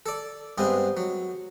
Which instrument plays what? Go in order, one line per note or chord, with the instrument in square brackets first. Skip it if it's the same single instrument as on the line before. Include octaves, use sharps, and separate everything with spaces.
[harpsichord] A4 D5
G2 G#3 B3 C4
F#3